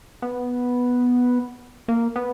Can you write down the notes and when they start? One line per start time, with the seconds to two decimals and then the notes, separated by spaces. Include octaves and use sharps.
0.22 B3
1.88 A#3
2.16 B3